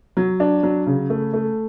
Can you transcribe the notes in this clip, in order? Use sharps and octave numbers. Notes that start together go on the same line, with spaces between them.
F#3
D4
F#3
C#3
A3
A3